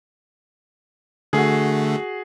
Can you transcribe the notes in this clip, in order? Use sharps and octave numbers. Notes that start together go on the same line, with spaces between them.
D3 A3 F#4 G#4